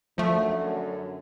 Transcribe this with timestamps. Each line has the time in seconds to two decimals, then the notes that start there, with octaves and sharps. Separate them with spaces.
0.18 F#2 D3 F3 A3